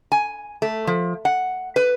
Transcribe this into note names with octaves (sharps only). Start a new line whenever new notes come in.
G#5
A3
F3
F#5
B4